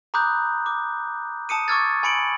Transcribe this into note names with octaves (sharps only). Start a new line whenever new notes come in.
A#5 B5 D6 D#6 F#6 G6
D6
A5 D#6 C#7 D#7
C#6 D6 E6 F6 G#6 A6
G#5 B5 C#7 D7 F#7